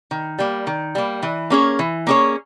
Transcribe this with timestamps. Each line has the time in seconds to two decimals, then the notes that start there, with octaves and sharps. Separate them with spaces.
0.11 D#3
0.39 G3 A#3
0.67 D#3
0.95 G3 A#3
1.23 E3
1.50 A#3 C#4 G#4 C#5
1.79 E3
2.07 A#3 C#4 G#4 C#5